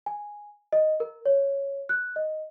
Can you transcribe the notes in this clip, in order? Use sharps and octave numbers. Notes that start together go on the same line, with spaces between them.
G#5
D#5
A#4
C#5
F#6
D#5